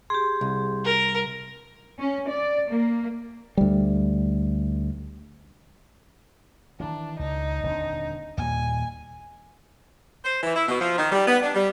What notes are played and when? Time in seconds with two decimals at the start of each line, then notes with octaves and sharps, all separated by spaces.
0.10 G4 G#4 C6
0.41 C2
0.85 A#4
1.99 C#4
2.29 D5
2.69 A#3
3.57 D2 G3
6.80 D#3 E3 D4
7.19 C#2 D#4
7.63 D#1 D3 C4
8.37 D#2 A#2 G3 G#5
10.25 C5
10.43 E3
10.56 E4
10.68 B2
10.81 F3
10.98 D#3
11.12 G3
11.27 B3
11.42 D4
11.55 G3